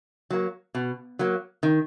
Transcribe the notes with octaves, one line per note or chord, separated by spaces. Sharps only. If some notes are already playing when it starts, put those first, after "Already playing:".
F#3 A#3
B2
F#3 A#3
D#3